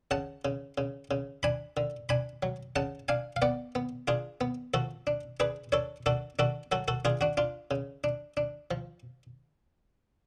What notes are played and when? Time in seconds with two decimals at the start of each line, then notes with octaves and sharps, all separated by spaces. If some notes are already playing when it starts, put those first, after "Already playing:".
0.11 C#3 F#5 A5
0.45 C#3
0.78 C#3
1.11 C#3
1.43 D4 G#5 B5
1.77 D3
2.09 D4 G#5 B5
2.43 F#3
2.76 C#3 F#5 A5
3.08 D4 F5 G#5
3.36 F5
3.42 B3 D5 F#5
3.75 B3
4.08 D4 F4 G#4
4.41 B3
4.74 F3 F#4 A4
5.07 D4
5.40 D4 G#4 B4
5.72 D4 A4 C#5
6.06 D4 F#4 A4
6.39 D4 F#4 A4
6.72 F#3 F#4 A4
6.88 F#4 A4
7.05 D4 F4 G#4
7.21 D4 F#4
7.37 D4 F4
7.71 C#3
8.04 D4
8.37 D4
8.71 F3